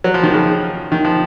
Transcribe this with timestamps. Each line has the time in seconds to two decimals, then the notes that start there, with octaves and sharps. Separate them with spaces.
0.04 F#3
0.14 F3
0.23 D#3
0.34 C#3 F3
0.92 D#3
1.04 F3